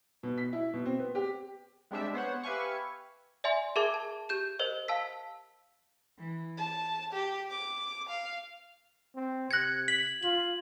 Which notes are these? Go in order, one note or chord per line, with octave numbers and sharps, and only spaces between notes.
B2
B6
E4
B2
C4
B3
G4
G3 G#3 C4 D4 G4 E5
B3 C5 C#5 F#5
G4 B4 E5 F5 G#5 C#6
D5 E5 G#5 C6
G#4 A#4 E5 A5 D6 G#6
A5
G4 G6 E7
A#4 C5 D#5
F5 A5 E6 B6
E3
A5
G4
D6
F5
C4
C3 F#6 G#6 A#6 C#7
B6 F#7
F4 F#7